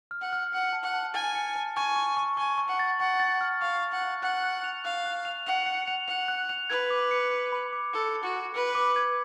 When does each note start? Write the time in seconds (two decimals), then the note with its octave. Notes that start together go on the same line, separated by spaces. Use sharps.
0.11 F6
0.22 F#5
0.33 F6
0.53 F#5 C#7
0.73 A5
0.83 F#5
0.94 A5
1.14 G#5 A6
1.35 C#7
1.56 A5
1.76 G#5 C#6
1.96 C#6
2.17 C#6
2.37 G#5 C#6
2.58 C#6
2.68 F#5
2.79 A6
3.00 F#5 C#6
3.20 A6
3.41 F6
3.61 F5 C#6
3.82 C#6
3.92 F#5
4.02 C#6
4.23 F#5 F#6
4.44 F#6
4.64 F7
4.85 F5 F#6
5.06 F#6
5.25 F7
5.47 F#5 F7
5.66 C#7
5.88 F7
6.08 F#5 F7
6.28 F#6
6.49 F7
6.70 B4 G#6
6.90 D6
7.11 C#7
7.32 C#7
7.52 B5
7.72 D6
7.93 A4 C#7
8.14 C#7
8.24 F#4
8.34 C#7
8.54 B4 C#7
8.75 D6
8.96 G#6